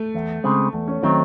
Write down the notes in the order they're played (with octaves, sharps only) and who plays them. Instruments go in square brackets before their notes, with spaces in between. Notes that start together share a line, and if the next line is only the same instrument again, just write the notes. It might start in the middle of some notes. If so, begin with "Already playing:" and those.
Already playing: [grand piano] A3
[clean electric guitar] E2
C#3 G#3 C4
[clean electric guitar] E2 [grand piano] A3
[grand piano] C#4
[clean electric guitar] D#3 F#3 A3 D#4 [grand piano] C4